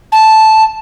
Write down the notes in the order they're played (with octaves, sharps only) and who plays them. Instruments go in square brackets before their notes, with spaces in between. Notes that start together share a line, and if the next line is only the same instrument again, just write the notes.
[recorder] A5